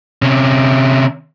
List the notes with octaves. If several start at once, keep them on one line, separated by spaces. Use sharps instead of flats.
C3 C#4